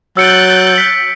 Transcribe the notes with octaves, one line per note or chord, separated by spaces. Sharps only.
F#3 E6 F#6 G6 A6 C#7 D7
B6